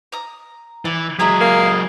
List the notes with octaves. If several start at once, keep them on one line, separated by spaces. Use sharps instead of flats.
A#5 D#6
E3 D5
F#3 G#3 G#4 E5 A#5 E6
A#3